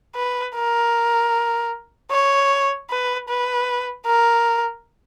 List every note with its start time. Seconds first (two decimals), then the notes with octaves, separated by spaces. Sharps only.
0.15 B4
0.55 A#4
2.11 C#5
2.90 B4
3.29 B4
4.06 A#4